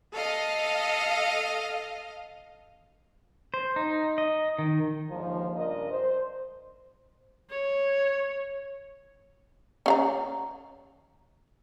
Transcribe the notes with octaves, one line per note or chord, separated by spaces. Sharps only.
A4 D#5 F5
C5
D#4
D#5
D#3
D#2 G#2 D3 F3
G2 C#3 D4 A#4 D#5
C5
C#5
C#4 F5 A#5